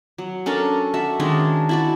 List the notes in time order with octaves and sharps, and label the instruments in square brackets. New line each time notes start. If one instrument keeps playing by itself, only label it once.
[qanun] F#3
C#4 D4 A4 A#4
F#4 E5
D#3 G#3 C#4 D4
E4 F#4 D5